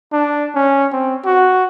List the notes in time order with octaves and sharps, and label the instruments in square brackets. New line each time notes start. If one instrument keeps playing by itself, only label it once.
[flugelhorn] D4
C#4
C4
F#4